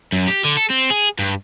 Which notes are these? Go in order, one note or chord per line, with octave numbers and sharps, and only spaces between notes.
F#2
G4
D3
A4
C4
G#4
G2